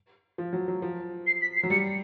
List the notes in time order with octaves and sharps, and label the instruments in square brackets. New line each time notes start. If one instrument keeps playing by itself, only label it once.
[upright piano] F3
F#3
F#3
F3
[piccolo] C7
B6
C7
[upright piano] F#3
[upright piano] G3 [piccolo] C#7